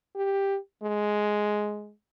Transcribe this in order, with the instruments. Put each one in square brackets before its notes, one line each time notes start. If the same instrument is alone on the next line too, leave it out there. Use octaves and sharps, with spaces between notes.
[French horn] G4
G#3